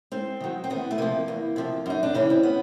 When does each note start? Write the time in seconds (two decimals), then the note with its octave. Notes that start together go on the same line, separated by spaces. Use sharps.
0.12 G#2 C4
0.41 D#3 F#3
0.64 C4
0.70 E2 B3
0.91 A3
0.98 C3 F3 A#3
1.28 E2
1.56 C3 F3
1.86 F#2 D#4
2.03 D4
2.14 C#3 E3 C#4
2.30 C4
2.43 B3